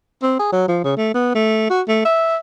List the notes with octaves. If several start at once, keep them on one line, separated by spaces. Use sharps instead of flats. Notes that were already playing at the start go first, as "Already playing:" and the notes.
C4
G#4
F#3
F3
C#3
A3
B3
A3
F#4
A3
E5